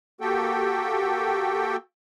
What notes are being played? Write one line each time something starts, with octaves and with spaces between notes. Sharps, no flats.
A#3 F#4 G4 A4 G5